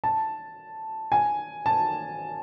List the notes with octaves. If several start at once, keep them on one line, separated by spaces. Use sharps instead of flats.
A5
G#5
A5